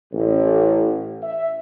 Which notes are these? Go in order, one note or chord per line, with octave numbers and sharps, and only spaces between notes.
A1
E5